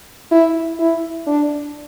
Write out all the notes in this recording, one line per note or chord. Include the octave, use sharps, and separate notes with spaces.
E4
E4
D4